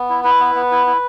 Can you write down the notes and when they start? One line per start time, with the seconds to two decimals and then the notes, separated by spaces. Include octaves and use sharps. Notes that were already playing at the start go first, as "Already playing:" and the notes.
Already playing: B3
0.09 E4
0.24 E4 B4
0.40 B3
0.55 B3
0.71 E4
0.87 E4